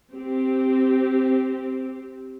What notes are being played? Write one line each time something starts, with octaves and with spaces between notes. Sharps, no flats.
C4 G4